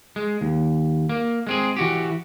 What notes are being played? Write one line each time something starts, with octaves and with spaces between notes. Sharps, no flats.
G#3
D#2
A#3
G#3 C4 G#4
E3 F#4 G4